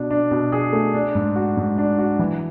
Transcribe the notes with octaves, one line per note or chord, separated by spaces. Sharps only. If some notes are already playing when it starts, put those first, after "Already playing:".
Already playing: B2 D4
D4
B2
G#4
A3
D4
G#2
F#4
G#2
D4
F#4
E3